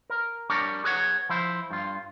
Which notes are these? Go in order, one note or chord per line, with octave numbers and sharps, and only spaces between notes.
A#4
G3 D4 A#4 C#5
G#4 B4 C#5 F#5
F3 E4 C5
G2 F4